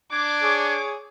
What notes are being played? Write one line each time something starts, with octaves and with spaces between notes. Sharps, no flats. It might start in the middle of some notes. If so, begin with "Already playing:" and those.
D4 D6 G#6
G#4 C#5